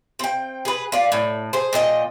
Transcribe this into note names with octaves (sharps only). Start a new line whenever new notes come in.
C4 G5
G#4 B4
F4 D5
A2
G#4 C5
A#2 F3 D#5 G5